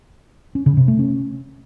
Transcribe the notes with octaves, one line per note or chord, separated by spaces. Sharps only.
C#4
C#3
C3
A3
C#4